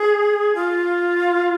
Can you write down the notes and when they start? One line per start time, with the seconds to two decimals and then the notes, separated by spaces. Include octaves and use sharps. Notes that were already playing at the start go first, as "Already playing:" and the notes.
Already playing: G#4
0.55 F4